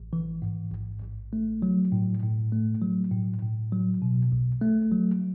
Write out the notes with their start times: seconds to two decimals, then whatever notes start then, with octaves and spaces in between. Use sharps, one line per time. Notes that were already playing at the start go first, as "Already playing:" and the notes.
Already playing: A1
0.13 E3
0.42 G#2
0.72 A1
1.02 A1
1.33 A3
1.62 F#3
1.92 A2
2.23 A2
2.52 A3
2.82 F#3
3.12 A2
3.42 A2
3.72 F#3
4.02 B2
4.32 B1
4.61 A3
4.92 F#3